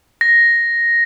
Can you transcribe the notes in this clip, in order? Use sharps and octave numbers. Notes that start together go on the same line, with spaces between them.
A#6